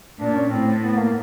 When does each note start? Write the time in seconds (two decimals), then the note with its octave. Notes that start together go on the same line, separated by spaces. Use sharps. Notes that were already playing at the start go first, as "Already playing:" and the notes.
0.19 A#2 D4
0.35 C#4
0.50 A2 C4
0.83 B3
0.98 A#3